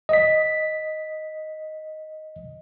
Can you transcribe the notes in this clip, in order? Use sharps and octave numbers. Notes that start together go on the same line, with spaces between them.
D#5 B6